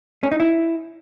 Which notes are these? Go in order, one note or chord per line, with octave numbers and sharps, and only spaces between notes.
C#4
D#4
E4